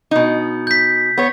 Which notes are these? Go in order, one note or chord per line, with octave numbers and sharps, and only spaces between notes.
B2 D#4
G6 B6
B3 C#5